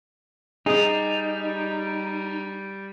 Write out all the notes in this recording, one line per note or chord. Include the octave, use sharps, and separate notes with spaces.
G3 D#4 G#4